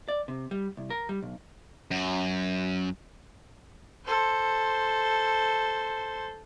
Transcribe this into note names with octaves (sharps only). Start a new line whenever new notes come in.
D5
C3
G3
C2
A#4
G3
B1
F#2
A4 C5